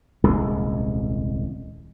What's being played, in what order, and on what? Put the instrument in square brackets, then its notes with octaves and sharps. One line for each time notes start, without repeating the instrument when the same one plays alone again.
[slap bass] D#1 C2 G#3